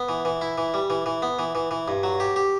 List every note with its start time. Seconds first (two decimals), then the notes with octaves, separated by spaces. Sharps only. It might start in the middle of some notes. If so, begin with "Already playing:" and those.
Already playing: B3
0.09 E3
0.25 E3
0.42 E4
0.58 E3
0.74 G3
0.90 E3
1.06 E3
1.22 B3
1.39 E3
1.55 E3
1.71 E3
1.88 G2
2.03 F#3
2.20 G4
2.36 G4